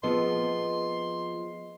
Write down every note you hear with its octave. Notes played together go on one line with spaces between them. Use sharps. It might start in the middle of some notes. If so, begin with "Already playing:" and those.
F3 B3 C4 G#4 D#5 C6